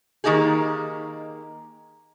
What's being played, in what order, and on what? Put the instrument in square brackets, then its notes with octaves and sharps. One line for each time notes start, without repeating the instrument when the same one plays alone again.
[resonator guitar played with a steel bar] D#3 A#3 D#4 G4 G#4